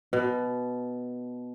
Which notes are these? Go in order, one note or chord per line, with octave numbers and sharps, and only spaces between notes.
B2